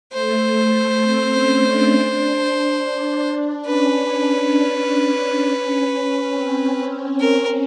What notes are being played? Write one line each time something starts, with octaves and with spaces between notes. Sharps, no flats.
A3 C5
C4
C#4
D4
C#4 B4
C#4
C#4
C4
A#4